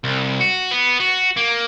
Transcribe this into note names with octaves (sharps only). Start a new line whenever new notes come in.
C2
F#4
B3
F#4
A#3